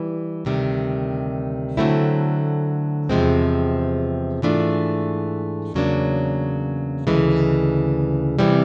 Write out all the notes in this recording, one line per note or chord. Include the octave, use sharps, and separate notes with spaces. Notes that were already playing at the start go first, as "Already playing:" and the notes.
Already playing: E3 G3
D2 C3 D#3 G3
D3 F#3 A3 C4 E4
E2 C3 F3 G#3 C4
G#2 E3 A3 D4 F4
E2 C#3 F#3 A#3 D4
D2 C#3 E3 G#3
C3 E3 G3 C4